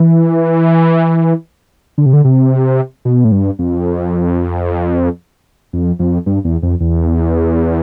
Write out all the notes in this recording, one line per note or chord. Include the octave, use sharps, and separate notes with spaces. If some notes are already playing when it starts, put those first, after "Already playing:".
Already playing: E3
D3
C3
D3
C3
B2
A2
G2
F2
F2
F2
G2
E2
F2
E2